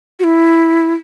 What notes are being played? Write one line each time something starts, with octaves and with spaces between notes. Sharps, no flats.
F#4
E4